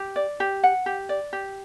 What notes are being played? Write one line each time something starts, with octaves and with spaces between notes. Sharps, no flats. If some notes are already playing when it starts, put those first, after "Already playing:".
Already playing: G4
D5
G4
F#5
G4
D5
G4